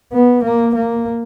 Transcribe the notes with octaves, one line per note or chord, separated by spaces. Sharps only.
B3
A#3
A#3